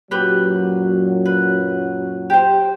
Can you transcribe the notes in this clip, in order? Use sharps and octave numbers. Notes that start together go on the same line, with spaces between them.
F#2 A#2 F#3 G4 B4
B4
G4 C5